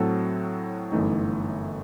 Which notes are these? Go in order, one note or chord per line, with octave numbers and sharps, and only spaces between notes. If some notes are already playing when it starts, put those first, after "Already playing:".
Already playing: A2 F#3 C4 F#4 A4
G1 F#2 E3 A3 D#4